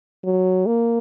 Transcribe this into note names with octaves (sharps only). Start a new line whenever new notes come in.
F#3
A#3